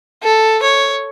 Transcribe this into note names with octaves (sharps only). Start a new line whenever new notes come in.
A4
C#5